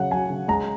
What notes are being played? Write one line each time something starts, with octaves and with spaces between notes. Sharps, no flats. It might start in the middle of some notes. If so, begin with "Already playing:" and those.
Already playing: C#3 F#3 F#5
F#3 G#5
C#3
G#3 A#5